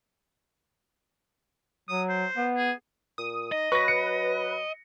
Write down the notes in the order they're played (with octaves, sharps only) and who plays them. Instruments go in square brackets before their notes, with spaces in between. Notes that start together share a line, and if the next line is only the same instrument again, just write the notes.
[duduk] F#3 [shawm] D#6
[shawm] C5
[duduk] B3
[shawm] G#4
[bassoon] A#2 [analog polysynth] D#6
[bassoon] D#4 [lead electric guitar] D#5
[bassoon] F#3 [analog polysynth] B4 [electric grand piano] C#6 A#6
[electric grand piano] C#7